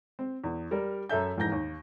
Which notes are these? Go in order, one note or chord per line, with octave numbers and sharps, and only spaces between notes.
C4
E2
G3 A#4 D5
F#2 A4 E5 G6
F1 G#2 E3 G6 A#6
D#2